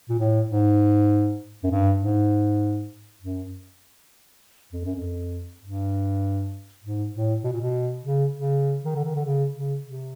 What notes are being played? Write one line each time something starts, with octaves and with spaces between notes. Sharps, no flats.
A#2
A2
G#2
F#2
G2
G#2
F#2
F2
F#2
F2
G2
G#2
A2
B2
A#2
B2
C#3
C#3
D#3
D3
D#3
D3
C#3
C#3
C3